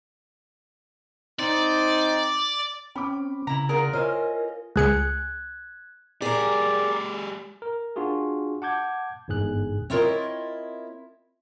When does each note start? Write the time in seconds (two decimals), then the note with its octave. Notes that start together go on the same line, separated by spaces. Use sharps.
1.39 C4 D#4 D5
2.96 C4 C#4 B5 D6
3.47 C#3 E4 A#5
3.69 F4 F#4 G#4 A#4 D5 A#5
3.93 E4 F4 A#4 C5 C#5 D#5 F5 G#5
4.76 C#2 G#4 F#6 G#6 C#7
6.22 G#3 G4 G#4 A#4 D5
7.62 A#4
7.96 D4 F4 F#4 G#4
8.62 F#5 A5 D6 G6 G#6
9.28 G1 E2 G#2 G#4 F#6
9.90 C4 E4 F4 A#4 C#5 D#5